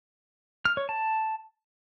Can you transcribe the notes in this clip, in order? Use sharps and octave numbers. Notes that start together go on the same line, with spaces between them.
F6
C#5
A5